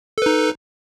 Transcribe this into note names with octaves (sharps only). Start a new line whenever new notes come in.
D#4 A4 B4